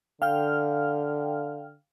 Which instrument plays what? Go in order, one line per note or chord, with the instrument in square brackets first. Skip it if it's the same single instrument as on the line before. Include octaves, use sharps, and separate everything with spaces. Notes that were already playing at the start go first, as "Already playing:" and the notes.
[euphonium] D3 [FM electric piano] F5 G5 F6